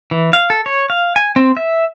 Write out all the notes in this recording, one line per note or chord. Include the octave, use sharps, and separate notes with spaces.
E3
F5
A4
C#5
F5
G#5
C4
E5